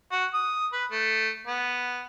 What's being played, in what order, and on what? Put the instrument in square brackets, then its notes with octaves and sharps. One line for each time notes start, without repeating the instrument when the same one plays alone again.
[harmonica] F#4
D#6
B4
A3
B3